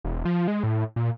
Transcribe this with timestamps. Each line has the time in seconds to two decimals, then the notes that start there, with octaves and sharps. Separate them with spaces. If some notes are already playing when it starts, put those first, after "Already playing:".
0.04 E1
0.25 F3
0.48 G#3
0.63 A2
0.96 A#2